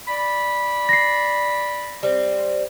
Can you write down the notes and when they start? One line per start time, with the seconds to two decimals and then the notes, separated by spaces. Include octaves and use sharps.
0.08 D5 B5
0.89 A#6 C7
2.03 G3 C4